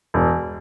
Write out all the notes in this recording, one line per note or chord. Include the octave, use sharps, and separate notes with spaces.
E1